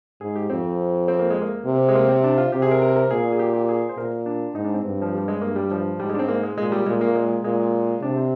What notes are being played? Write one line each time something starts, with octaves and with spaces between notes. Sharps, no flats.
G#2 G#4
G4
F2 C4
C4
A#3
G#3
A#3
C3
G#3
A#3
C4
D4
F4
C3 G4
G#4
A#4
A#4
A#4
A#2 G#4
G#4
G4
G4
G#4
C5
A#2 A#4
D4
G#2 D#4
D4
C4
G2
F3
G3
G#3
G2 A#3
G3
F3
G#2 G3
G#3
D4
C4
A#3
G#3
A#2 G#3
G3
A#2 G#3
A#3
G#3
A#2 G#3
C3 D4
C4